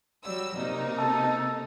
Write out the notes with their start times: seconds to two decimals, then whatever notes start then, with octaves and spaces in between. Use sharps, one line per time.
0.24 F#3 G3 E6
0.57 C3 A#3 D#4
0.99 A4 A5